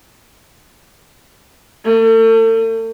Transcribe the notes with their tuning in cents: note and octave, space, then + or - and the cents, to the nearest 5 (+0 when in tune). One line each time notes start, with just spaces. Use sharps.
A3 +40